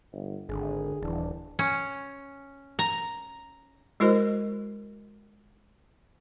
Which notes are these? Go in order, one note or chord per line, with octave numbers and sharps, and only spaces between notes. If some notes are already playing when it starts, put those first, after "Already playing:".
G1
G#1 D3 G#4
D#1 E3 D4
C#4
A#5
G#3 E4 F#4 A#4 C5 D#5